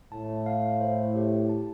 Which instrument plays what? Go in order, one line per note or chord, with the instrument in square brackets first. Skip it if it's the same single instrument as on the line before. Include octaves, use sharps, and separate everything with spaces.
[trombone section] A2 [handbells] A5
[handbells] F5
C5
G4
A5